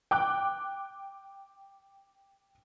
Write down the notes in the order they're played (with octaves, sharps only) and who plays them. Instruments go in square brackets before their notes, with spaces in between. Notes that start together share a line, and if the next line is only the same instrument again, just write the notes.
[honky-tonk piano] G5 D6 F#6